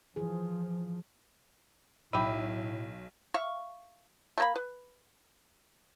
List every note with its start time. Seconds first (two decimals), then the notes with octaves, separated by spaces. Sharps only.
0.16 E3 F3 G#4
2.13 B1 A2 G4 E5 B5 D#7
3.34 E5 F5 C#6
4.38 A3 A#3 B5
4.56 B4